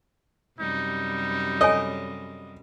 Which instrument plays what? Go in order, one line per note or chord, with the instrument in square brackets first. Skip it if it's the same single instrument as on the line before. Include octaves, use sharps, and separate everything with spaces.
[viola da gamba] F#2 C3 G3 [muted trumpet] D#4
[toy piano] A4 C#5 G#5 [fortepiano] D#5